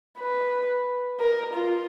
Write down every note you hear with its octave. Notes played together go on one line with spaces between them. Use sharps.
B4
A#4
F4